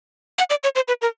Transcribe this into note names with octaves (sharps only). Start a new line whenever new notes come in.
F#5
D5
C#5
C5
B4
A#4